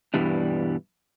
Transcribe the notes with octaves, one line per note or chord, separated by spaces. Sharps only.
G2 B2 E3 G3 D4